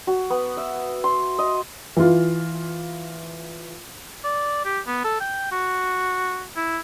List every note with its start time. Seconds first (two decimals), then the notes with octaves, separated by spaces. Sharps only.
0.07 F#4
0.30 B3
0.57 E5
1.04 C6
1.39 D#5
1.97 E3 F4
4.24 D5
4.65 G4
4.87 B3
5.05 A4
5.20 G5
5.52 F#4
6.56 E4